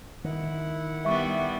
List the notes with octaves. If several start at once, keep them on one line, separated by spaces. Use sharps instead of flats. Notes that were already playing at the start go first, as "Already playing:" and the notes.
D#3 E4 F#5
G3 B3 E5 C#6